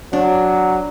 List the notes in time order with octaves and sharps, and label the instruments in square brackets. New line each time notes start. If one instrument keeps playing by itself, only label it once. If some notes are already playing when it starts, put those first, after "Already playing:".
[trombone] F#3 [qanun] D4